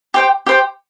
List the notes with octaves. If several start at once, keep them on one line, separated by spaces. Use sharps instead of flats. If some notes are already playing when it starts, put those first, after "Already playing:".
G4 C5 G5
G4 C5 G5